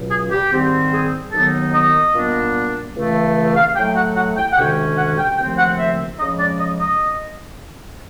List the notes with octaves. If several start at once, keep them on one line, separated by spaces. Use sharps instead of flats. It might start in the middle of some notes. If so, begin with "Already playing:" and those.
Already playing: C#2 B2 F#3
G#4
G4
G#2 D#3 G3 C4
G#4
D#2 D#3 F#3 B3 D#4 A4
D#5
A#2 G3 B3 D4
C#2 C#3 E3 A3
F5
A2 F#3 A3 G5
F#5
F#5
G5
F#5
D2 C3 D#3 G#3 C#4 G5
F#5
G5
D#2 C#3 F3 A3 C4 G5
F#5
E5
C#3 F3 G#3 C#4 D#5
D5
D#5
D#5